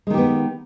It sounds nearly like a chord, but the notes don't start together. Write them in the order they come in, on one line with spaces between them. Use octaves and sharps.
G#3 D#3 G4 B3